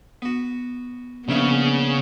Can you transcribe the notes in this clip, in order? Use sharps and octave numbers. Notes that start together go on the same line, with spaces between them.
B3 F#4
A#1 C#3 B3 E4 C#6